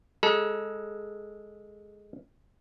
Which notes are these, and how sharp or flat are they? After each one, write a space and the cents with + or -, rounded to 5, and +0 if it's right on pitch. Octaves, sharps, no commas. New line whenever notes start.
G#3 +0 A4 +0 A#5 +45